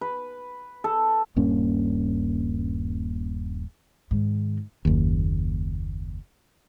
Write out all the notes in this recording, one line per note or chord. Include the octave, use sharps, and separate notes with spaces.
B4
A4
D#1 G2 A#3 C#4
G#2 D#3
F#1 D#2